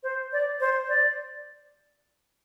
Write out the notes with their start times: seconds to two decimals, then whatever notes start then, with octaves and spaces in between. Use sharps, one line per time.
0.03 C5
0.33 D5
0.60 C5
0.89 D5